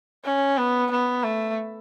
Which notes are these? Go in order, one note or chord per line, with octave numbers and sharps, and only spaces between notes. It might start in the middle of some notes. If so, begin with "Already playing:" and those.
C#4
B3
B3
A3